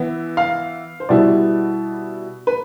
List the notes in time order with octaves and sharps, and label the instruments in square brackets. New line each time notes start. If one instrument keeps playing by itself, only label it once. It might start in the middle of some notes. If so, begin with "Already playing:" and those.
Already playing: [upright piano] E3 B3 E4
F5
C5
B2 G3 B3 E4 D5
B4